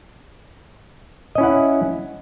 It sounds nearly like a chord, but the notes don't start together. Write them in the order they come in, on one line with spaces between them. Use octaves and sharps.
D#5 C#4 E4 F#5